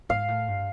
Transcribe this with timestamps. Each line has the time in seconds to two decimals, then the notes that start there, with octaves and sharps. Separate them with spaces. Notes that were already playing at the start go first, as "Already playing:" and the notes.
0.09 G#2 F5
0.28 A2
0.48 G2